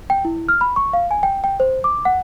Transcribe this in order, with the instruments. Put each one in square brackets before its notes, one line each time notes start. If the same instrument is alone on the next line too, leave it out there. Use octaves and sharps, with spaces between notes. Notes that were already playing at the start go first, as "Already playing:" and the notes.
[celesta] G5
E4
F6
B5
C#6
F5
G#5
G5
G5
C5
D6
F#5